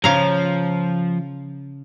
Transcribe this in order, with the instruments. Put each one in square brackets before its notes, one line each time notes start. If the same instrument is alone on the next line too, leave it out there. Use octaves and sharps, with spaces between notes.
[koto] C#3 F5 A#5 [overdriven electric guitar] F3